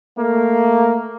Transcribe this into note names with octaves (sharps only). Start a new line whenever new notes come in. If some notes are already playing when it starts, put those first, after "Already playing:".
A3 A#3